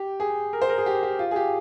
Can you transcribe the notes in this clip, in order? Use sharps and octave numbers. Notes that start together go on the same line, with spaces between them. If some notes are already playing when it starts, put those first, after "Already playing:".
Already playing: G4
G#4
A#4
C5
A#4
G#4
G4
G4
F4
G#4
G4